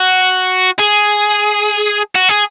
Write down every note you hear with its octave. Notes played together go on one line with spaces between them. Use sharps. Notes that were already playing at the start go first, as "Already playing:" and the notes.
Already playing: F#4
G#4
F#4
G#4